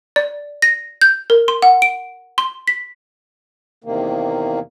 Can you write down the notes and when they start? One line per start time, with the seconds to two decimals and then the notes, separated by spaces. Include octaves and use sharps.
0.16 D5
0.62 A#6
1.01 G6
1.30 A#4
1.48 C6
1.62 F#5
1.82 D7
2.38 C6
2.68 B6
3.84 E2 C3 D#3 A#3